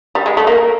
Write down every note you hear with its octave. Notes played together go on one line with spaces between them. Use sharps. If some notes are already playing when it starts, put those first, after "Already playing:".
G3
G#3
A3
A#3